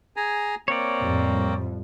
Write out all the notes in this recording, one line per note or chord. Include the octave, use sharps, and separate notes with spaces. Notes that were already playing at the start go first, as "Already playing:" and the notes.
G#4 G#5 A#5
A#3 C4 C#5 D5
F2 A2 G3